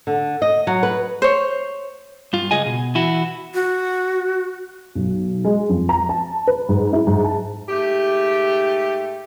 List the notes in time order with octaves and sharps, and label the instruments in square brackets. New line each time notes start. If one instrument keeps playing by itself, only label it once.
[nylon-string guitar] D3
D#5
F#3
B4
[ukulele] C5 C#5
[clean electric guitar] G2 F4
C#2 G#4 D#5 G#5
B2
E3 E4 F#4
[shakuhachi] F#4
[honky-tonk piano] B1
G#3
F2
A#5
A5
B4
G#2
E4
G#2
A5
[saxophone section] G#2 A3 G4